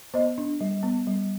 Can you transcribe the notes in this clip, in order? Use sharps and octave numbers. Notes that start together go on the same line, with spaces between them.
B3 C5 D#5
D4
G3
B3
G3